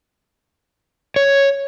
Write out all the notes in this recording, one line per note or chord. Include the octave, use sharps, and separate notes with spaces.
C#5